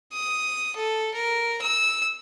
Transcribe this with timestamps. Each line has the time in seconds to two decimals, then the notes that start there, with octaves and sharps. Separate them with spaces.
0.13 D#6
0.76 A4
1.14 A#4
1.61 E6